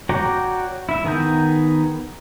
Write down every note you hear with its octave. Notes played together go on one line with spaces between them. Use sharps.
F#4 C#5 D5 G5 A#5
E4 E5
D#3 B3 G#4 A#5 G6